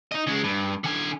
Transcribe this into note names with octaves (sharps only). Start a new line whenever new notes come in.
D#4 D#5
C#3 G#3
G2
D3 G#5